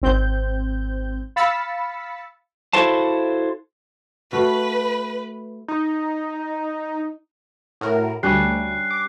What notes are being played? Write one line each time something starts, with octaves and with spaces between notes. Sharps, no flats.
G#1 C4 G6
F5 B5 E6 A6 B6 C#7
E4 F#4 A4 C5 F5 A5
A3 F#4 B4 F5
D#4
A2 F#4 A#4
D2 G3 C#4 D4 F#6 C7
D6